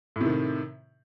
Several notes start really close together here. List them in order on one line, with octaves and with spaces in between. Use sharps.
A2 C3 D#3